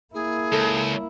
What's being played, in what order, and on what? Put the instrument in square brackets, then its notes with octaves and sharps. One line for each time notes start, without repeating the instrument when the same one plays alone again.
[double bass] A#3 E4 [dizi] G#4
[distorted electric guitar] C#2 [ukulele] A4